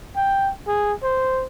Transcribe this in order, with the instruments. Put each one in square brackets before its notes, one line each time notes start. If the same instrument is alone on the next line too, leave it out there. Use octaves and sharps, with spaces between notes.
[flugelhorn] G5
G#4
C5